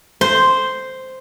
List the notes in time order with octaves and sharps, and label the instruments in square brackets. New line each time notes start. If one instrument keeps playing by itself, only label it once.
[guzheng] C5